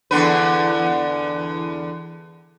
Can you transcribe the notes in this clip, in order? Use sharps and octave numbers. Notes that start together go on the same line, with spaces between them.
E2 D3 B4